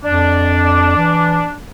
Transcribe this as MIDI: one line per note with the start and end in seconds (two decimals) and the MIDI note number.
0.04 0.96 41
0.04 1.51 62
0.97 1.45 52